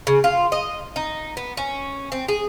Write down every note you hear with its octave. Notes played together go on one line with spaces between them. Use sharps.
C#3
F4
D#5
D#4
B3
C#4
C4
G#4